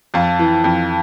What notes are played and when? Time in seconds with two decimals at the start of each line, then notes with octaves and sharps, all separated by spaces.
0.14 F2 F5 A5
0.39 E3
0.64 F2